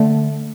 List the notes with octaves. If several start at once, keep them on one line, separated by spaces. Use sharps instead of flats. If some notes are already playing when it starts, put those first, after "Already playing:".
Already playing: D3 A3